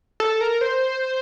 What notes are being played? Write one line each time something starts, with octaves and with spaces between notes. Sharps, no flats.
A4
A#4
C5